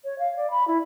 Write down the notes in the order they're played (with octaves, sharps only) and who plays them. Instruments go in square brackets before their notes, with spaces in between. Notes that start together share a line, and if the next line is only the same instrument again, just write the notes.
[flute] C#5
F5
D5
B5
E4